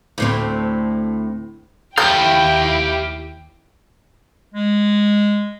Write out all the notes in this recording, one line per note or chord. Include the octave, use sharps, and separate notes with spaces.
D2 A2 C4
D#2 E4 G4 F5 G5 G6
G#3